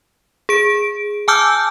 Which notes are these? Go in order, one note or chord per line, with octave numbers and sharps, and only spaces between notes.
G#4 D7
G#5 A5 D6 E6 F6 G6